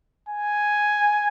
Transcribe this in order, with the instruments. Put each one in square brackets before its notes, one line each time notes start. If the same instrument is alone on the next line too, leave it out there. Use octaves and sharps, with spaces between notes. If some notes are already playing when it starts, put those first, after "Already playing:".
[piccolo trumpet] G#5